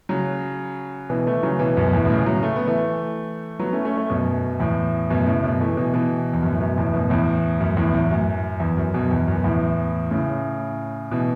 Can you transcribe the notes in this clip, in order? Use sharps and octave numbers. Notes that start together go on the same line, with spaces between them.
C#3 F#3
B2 E3
E3 A3
C#3 F#3
B2 E3
F#2 B2
E2 A2
B2
A2 C#3
C#3 F#3
A3
B3
E3 A3
F#3 B3
A3 C#4
A3 C#4
A3 C#4
F#2 B2
E2 A2
F#2 B2
A2 C#3
F#2 B2
E3 A3
B2 E3
B2 E3
E2
F#2
A2
F#2 B2
E2 A2
F#2 B2
E2 A2
F#2
E2 A2
E2 A2
F#2
E2
F#2
F#2 B2
E2
F#2
B2
E2 A2
A2 C#3
B2 E3